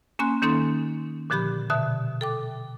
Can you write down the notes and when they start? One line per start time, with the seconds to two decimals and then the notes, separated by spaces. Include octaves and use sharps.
0.19 A#3 C#4 G#5 C6 F#6
0.42 D#3 A#3 C#4 D#4 A4 C6
1.30 A#2 D3 F3 G4 B5 G6
1.70 B2 D3 E5 A5
2.21 A4 G5 D6